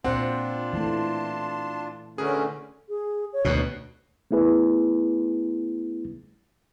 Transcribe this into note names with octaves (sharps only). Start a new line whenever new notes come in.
A#2 C4 D4 F4 C5 F#5
E3 A3 A5 C6
D3 A3 C#4 F#4 G#4 A#4 B4
G#4
C#5
D2 B2
A3 B3 E4 G#4 B4